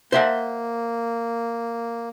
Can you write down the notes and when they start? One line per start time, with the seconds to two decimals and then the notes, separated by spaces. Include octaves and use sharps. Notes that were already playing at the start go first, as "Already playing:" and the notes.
0.12 A#3 C5 E5 F#5